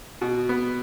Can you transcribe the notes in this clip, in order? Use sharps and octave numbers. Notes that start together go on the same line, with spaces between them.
B2 F#4
B3